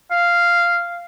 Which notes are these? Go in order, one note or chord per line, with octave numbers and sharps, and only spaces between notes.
F5